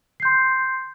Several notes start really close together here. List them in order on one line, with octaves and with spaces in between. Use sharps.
C7 G6 C6